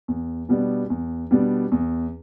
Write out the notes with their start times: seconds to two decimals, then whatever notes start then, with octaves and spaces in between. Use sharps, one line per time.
0.08 E2
0.49 B2 G3 B3 D4
0.90 E2
1.31 B2 G3 B3 D4
1.72 E2